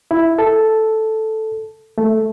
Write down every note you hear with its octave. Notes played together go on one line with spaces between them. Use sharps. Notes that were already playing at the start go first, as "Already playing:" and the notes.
E4
A4
A3